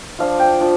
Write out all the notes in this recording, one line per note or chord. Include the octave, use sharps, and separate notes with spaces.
F3 D4 F4 F5
G5
F3 D4 F4